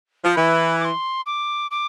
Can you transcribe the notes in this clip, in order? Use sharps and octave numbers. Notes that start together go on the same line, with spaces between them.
F3
E3 B5
D6
C6
D6
D6